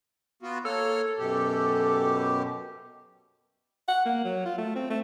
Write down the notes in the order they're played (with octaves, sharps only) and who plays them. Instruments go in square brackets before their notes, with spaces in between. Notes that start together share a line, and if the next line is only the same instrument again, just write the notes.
[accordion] B3 F4 F#4
[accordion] A#3 C#5 F6 [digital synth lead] A4
[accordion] F#2 B2 G4
[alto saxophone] F#5
A#3
F#3
F4
A3
C4
A3